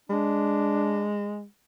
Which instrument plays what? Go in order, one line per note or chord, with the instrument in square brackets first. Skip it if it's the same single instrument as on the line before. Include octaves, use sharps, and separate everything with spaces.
[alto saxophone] G#3 [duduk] D4